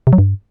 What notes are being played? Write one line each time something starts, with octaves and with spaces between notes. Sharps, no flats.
C3
F#3
G2